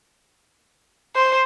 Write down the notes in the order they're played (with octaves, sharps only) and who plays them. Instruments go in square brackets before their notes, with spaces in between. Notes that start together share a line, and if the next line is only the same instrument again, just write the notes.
[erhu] C5